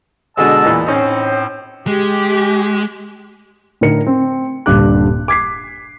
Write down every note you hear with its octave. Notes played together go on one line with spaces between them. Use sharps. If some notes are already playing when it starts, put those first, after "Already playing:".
B2 D3 G#3 D#5 A5 E6
E2 A#2
A2 C4 C#4 D#4
G#3 G4
A2 D3 D#4 A#4 C#7
C4
D#1 G2 D3 D6 F#6
D6 G#6 B6 C7